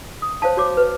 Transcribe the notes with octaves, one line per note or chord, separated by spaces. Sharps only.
D#6
C5 C#5 F5 A5
F#4 C#5 D6
B4